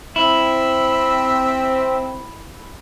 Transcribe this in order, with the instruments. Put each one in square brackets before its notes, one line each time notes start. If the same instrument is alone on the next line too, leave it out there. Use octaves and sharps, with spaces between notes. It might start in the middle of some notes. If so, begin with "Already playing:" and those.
[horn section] C4 [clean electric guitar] E4 [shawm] E5